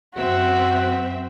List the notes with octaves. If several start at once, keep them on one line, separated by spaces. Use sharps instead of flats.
F#2 C4 F#4 E5